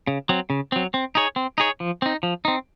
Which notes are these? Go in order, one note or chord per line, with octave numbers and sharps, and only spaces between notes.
C#3
F#3 C4
C#3
F#3 C4
C4
D#4 G#4 C#5
C4
D#4 G#4 C#5
F3
C4 D#4
F3
C4 D#4